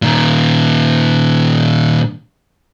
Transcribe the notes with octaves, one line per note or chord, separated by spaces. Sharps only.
A#2 D#3